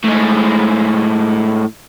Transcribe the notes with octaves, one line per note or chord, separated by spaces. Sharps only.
A2 G#3